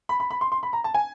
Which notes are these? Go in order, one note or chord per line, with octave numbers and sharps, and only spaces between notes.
B5
B5
B5
C6
C6
B5
A#5
A5
G#5